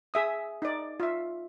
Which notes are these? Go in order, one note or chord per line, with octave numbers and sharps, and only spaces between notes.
G#4 E5 D#6
D#4 D5
F4 E5